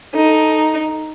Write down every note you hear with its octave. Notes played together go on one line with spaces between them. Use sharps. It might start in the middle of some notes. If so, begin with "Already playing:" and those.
D#4 A4